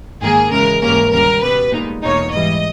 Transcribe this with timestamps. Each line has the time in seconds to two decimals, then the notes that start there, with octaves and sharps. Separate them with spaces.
0.21 G#2 D#3 A#3 G#4
0.51 C#3 E3 G#3 A#4
0.82 G#2 E3 G3 A#3 C#4 A#4
1.12 D#2 C#3 G3 A#4
1.42 B2 G3 B3 B4
1.72 A#2 G#3 B3 D#4
2.02 E2 B2 A#3 D#4 C#5
2.32 G#2 E3 G3 D#5